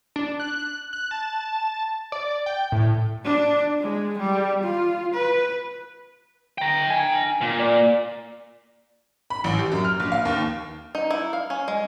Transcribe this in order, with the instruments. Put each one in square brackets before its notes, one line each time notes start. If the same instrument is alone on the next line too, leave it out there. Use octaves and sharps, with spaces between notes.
[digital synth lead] D4
F#6
F#6
A5
D5
G5
A2
[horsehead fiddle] D4
G#3
G3
F4
B4
[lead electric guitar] G5 A#5
[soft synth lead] G#5
[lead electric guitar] A#2
[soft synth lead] D5
[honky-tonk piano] B5
A1
G4
F#2
F6
A#1
F5
D#2
[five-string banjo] D#4
E4
F5
C#4
G#3